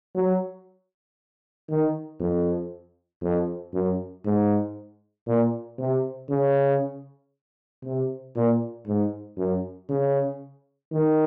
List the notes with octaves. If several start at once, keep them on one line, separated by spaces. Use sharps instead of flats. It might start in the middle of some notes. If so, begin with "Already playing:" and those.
F#3
D#3
F2
F2
F#2
G#2
A#2
C3
C#3
C3
A#2
G#2
F#2
C#3
D#3